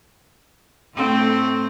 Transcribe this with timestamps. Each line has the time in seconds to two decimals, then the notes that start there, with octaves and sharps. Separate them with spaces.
0.94 A2 A3 C4